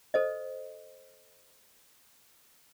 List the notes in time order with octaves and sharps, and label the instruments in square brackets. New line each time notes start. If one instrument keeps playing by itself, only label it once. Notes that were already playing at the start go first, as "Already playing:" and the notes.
[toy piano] A4 C5 D#5